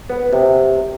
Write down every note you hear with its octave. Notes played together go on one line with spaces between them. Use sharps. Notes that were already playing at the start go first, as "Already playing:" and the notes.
B3
C3